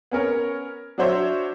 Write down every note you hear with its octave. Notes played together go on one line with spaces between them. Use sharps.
B3 C#4 A#4 C#5
F#3 D4 F#4 C5 C#5 E5